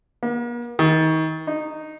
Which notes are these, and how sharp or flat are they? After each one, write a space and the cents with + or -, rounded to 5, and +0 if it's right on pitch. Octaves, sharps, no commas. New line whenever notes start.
A#3 +45
D#3 +35
D#4 -10